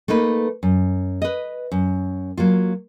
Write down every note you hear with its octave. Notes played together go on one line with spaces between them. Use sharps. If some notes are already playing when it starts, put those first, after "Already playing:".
A3 A#3 D#4 B4
F#2
B4 D#5
F#2
F#3 A#3 F4